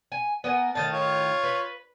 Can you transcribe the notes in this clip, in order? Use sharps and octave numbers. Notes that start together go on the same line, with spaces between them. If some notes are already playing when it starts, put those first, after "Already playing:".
G#5
B3 A#4 G#5
A2 D#3 F5 A5
F4 C#5
B4